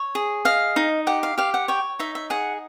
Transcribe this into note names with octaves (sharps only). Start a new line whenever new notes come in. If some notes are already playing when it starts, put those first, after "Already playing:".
Already playing: C#5
G#4
D#5 F5
D#4
G4 F#5
F5
G4 F5
F#5
C#5 G5
D#4 E5
E5
G#4 F#5